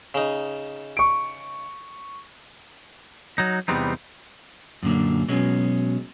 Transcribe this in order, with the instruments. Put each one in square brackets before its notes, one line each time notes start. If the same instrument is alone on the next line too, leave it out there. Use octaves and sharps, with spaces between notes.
[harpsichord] C#3 D#4
[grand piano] C#6 D7
[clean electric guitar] F#3 D#4
E2 C3 G3 B3 C4 D#4
F#2 A#2 D3 A#3
B2 F#3 G#3 C#4